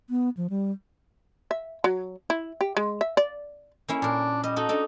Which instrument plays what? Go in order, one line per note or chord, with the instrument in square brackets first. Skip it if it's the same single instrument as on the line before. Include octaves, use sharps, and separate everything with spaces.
[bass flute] B3
F3
G3
[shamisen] E5
F#3
E4
G4
G#3
E5
D5
[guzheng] A#3 C#4 E4
[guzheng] A#2 A#4 [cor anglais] D4
[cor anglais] G3 [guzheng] D#5
[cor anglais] D#4 [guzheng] F#4 A4
[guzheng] D4 A4 D#5